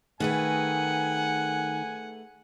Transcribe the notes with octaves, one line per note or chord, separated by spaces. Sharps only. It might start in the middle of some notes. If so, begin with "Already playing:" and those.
D#3 A3 G#4 B4 F#5 G#5